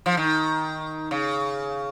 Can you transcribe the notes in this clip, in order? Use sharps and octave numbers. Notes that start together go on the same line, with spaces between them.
F3
D#3
C#3